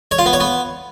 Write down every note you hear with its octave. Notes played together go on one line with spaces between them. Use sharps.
C#5
F4
B3
C#5
B3